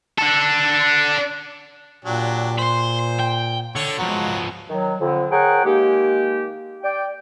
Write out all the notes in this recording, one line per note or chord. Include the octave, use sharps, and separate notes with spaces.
D4 A4
A#2 F#3 D4 G4
C5 B5 C6
G5
D3 C#5 C#6
F3 F#3 G#3 B3
D#3 F#3
F2 D3
G#4 A#4 C#5 F#5 G5
D#3 G#3 A#3 G4
D5 G5